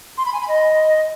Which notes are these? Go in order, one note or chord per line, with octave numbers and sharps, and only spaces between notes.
C6
B5
G#5
B5
D#5